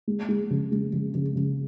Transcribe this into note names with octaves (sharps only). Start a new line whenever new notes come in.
G#3
G#3
C#3
G#3
C#3
C#3
C#3